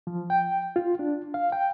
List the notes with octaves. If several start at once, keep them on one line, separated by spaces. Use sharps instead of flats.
F3
G5
F4
D4
F5
G5